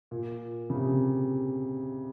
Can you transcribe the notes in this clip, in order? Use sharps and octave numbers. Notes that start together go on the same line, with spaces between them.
A#2
C#3
C3